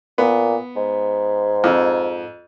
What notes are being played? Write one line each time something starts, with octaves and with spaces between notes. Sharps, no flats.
A#2 B3
G#2
F2